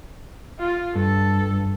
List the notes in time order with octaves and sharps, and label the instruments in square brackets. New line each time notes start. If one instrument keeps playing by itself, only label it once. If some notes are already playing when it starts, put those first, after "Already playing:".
[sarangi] F4
[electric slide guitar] G2 [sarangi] A4